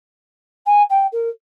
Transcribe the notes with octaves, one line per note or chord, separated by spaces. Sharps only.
G#5
G5
A#4